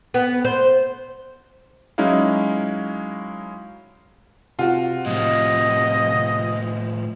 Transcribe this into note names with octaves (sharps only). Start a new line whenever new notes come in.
B3
C5
F#3 G#3 C#4 D#4 E4 F5
C3 F4 F#4
A2 F3 D#5